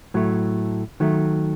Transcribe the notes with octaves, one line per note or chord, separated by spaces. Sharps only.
A2 F#3 A3
D#3 F#3 A3